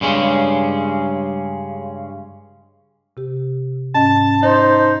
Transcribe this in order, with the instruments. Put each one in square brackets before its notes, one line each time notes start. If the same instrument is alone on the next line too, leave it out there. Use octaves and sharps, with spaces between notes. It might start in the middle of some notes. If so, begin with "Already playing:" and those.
[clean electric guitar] G2 C#3 G#3 C#4
[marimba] C3 G4
[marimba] G#2 C#4 D#5 [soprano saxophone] A5
[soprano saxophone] D#4 [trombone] C5